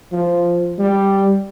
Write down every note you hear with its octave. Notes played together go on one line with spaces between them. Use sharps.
F3
G3